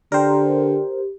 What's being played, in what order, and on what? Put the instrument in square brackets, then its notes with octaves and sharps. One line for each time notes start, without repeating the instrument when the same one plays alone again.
[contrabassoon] D3 [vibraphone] G4 [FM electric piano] A#4 C5 [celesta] D5 G5